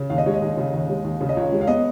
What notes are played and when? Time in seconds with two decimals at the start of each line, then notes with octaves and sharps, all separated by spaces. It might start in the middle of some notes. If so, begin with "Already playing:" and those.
Already playing: C#3
0.10 D#2 F5
0.18 D#5
0.26 G#3 C#5
0.34 D#5
0.42 D#2
0.57 C#3
0.74 D#2
0.89 G#3
1.04 D#2
1.21 C#3
1.29 D#5
1.36 C#2 C#5
1.52 G#3
1.61 F5
1.67 B3 D#5